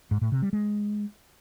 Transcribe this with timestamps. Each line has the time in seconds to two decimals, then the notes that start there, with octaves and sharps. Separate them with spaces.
0.11 G#2
0.21 A2
0.32 C3
0.42 G3
0.53 G#3